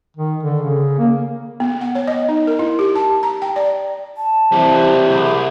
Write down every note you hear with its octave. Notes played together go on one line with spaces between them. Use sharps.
D#3
D3
C#3
A#3
B3
F#5
C#5
D#5
D#4
A#4
E4
G4
A5
A#5
G5
D5
A5
C3 E3 G3
C2 G#4